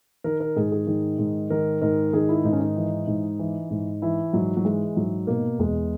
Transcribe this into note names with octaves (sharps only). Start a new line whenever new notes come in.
D#3 A#4
A#4
G#2 G#4
G#4
D#3
G#2
D#3 A#4
G#2 A#4
D#3 G#4
E4
G#2 D#4
C#4
D#4
E3
G#2
E3
G#2
E3 E4
G#2 F#3
F#3
E3 G#3
G#2 F#3
B2 A#3
E2 G#3